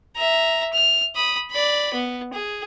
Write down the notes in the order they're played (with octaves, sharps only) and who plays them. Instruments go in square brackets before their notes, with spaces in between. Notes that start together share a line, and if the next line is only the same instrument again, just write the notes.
[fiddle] E5 A#5
F6
B5 D#6
D5 B5
B3
G#4